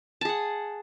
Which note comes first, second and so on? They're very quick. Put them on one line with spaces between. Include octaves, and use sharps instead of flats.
A5 G#4 F#5